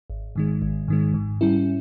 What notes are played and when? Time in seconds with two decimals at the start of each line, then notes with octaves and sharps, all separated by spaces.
0.10 G#1
0.36 G#2 D#3 G#3
0.62 G#1
0.88 G#2 D#3 G#3
1.14 G#2
1.41 G3 C#4 E4